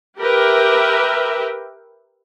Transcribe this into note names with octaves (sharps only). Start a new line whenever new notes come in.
G4 A#4 B4 E5 G5